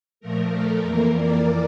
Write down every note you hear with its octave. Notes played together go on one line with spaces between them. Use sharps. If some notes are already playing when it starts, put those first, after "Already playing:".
A#2 F3 A3 A#4
A4
F2 E3 A#3 A#4
D5